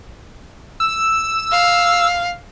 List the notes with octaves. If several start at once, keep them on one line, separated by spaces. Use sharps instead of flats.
E6
F5